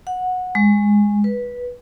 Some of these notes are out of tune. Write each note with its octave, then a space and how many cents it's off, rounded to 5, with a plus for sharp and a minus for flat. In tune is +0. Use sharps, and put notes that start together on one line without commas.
F#5 -15
G#3 -10
B4 -15